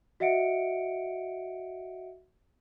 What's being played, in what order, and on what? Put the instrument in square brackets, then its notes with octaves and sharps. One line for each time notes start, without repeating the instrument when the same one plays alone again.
[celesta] F#4 D#5 E5 F#5 C#7 D7